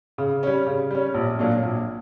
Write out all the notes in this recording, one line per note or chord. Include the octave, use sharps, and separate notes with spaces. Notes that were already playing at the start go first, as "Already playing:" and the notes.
C#3
G3 C#4
C#3
G3 C#4
A#1
A#2 F#3 A#3 D4
A#1